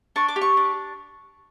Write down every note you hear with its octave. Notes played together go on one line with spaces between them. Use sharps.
D4 C#6
D6
G4
C#6
D4